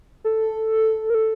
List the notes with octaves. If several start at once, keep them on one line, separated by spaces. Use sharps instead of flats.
A4
A#4
A4